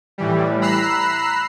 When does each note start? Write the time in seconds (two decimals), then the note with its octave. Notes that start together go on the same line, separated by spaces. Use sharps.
0.18 A2 E3 G3
0.61 A#5 B5 E6 F#6 C7